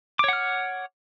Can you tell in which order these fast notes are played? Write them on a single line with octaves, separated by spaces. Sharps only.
D6 C#5 F#5 F6